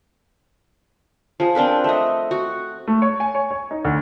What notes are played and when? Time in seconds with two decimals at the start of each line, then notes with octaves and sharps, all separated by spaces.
1.40 F3 G#4
1.55 C4 D4 A#4 B4
1.84 A3 D#5
2.31 F#4
2.87 A3
3.02 C#5
3.20 G#5
3.35 C#5
3.51 C#5
3.71 D#4
3.85 D2